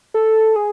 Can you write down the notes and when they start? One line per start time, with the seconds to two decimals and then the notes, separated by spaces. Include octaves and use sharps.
0.14 A4
0.56 G#4